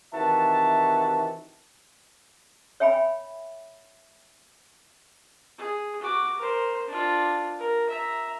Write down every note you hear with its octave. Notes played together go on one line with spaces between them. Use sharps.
C3 D#3 E3 F#4 E5 A5
C#5 E5 G5 G#5 B5
G#4
F#4 D6
A#4 C5
D4 F4
A#4
E5 A#5